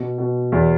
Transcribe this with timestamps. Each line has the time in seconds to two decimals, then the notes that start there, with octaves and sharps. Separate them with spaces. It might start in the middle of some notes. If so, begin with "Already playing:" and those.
Already playing: B2
0.18 B2
0.52 E2